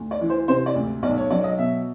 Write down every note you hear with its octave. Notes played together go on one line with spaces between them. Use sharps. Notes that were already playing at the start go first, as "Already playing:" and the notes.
Already playing: D2
D5
E3
C5
C3 C5
D5
D2
B1 D5
C#5
F#3 D5
D#5
B2 E5